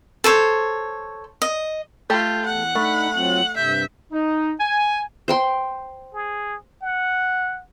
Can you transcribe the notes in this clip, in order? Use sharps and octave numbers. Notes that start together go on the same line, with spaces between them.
A4 C5 C#5
D#5
A3 F4 G4 A4 G6
E2 F#5
A3 D4 D#4 B5
F#3 C4 F4 F#7
G2 C3 E5 G6
D#4
G#5
C5 G5 C6
G#4
F#5